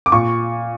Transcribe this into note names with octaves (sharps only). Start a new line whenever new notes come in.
D6
A#2 C#6